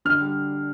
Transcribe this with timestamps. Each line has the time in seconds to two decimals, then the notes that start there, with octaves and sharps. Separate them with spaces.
0.05 D3 F6
0.20 G3